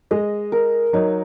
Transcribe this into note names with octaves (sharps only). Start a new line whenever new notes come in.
G#3 D#5
A#4
F#3 D#4